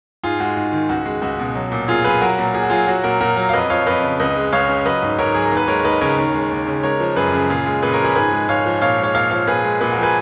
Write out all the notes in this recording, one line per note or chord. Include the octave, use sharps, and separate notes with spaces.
G#2 F4 G#4
G#3 F#4
G#2
D#3
C#2 F#4
G#3
C#2 F#4
B2
F#3
A#2
A#2 F4 G#4
F#3 G#4 B4
F#3 F#4 A#4
A#2
A#2 G#4
F#4
F#3 F4 G#4
F#3 F#4
A#2 F#4 A#4
A#2 F#4 A#4
F#3
F5
F2 B4 D#5
F3 C#5 F5
F2 B4 D#5
C#3
C#2 B4 D#5
G#3
C#2 C#5 F5
C#3
F#3 B4 D#5
G#2
G#2 A#4 C#5
F#3 G#4
A#4
D#2
B4
G#3 A#4 C#5
D#2 B4 D#5
C#3 A#4 C#5
D#2
G#3
D#2
C#3
G#3 A#4 C#5
F3
F#2 G#4 B4
C#3
A#2 F4 G#4
G#3
A#2 G#4 B4
A#4 C#5
F3 G#4 B4
G#2 G#4 B4
G#3
G#2 C#5 F5
F3
A#2 C#5 F5
G#3
C#5 F5
A#2 C#5 F5
F3 C#5 F5
A#2 G#4 B4
G#3
A#2 G#4 B4
F#4 A#4
F3
G#4 B4